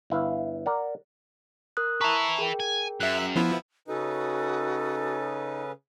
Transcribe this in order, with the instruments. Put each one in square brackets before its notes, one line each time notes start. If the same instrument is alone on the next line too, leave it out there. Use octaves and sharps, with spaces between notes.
[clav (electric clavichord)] G1 E4 B4 F5
A#4 D5 F#5
[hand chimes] A#4 D#6 F#6
[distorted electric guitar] B4 E5 [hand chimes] A5 A#5 C#6
[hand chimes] G#4 A#4 G5
[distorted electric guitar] G#5
[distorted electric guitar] F#2 [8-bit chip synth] E5 F#6
[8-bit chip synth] F3 B3 E4
[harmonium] C#3 C#4 B4 [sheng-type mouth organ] D#4 [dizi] F#4 [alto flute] A4